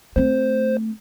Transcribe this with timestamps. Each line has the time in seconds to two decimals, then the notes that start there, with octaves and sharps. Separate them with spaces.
0.16 A3 C4 C5